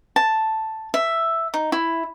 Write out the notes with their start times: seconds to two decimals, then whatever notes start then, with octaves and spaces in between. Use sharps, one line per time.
0.16 A5
0.94 E5
1.54 D#4
1.72 E4